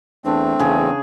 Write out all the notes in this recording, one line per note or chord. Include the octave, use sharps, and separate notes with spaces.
E2 A3 C4 D4
E2 C#3 G#4